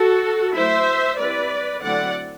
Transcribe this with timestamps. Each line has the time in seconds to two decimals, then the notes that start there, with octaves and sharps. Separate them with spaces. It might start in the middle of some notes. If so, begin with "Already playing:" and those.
Already playing: F#4 A4
0.54 F#3 A3 E4 C5 E5
1.18 G3 C4 E4 B4 D5
1.82 D3 F#3 A3 C4 E4 D5 F#5